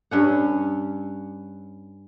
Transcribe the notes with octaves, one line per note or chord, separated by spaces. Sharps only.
G2 C#4 F#5